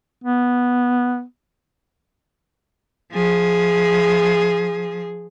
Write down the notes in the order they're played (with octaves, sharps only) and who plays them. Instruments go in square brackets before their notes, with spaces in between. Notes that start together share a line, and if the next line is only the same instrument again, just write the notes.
[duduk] B3
[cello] F3 G#4